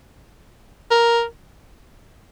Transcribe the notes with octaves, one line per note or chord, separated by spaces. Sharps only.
A#4